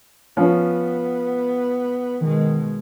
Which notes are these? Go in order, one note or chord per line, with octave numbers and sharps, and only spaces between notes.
F3 B3 C#4
B2 D#3 G#3